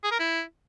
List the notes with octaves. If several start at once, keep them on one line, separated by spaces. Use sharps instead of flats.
G#4
A#4
E4